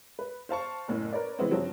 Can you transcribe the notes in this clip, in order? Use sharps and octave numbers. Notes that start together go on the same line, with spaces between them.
B4
C5 F5 A5 C#6
F#1 A2
A#4 B4 C#5 D5
C#3 E3 G#3 B3 C4
G2 C#3 F3 F#3 C4